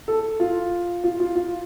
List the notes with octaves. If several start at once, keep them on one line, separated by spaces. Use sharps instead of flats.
A4
F4
F4
F4
F4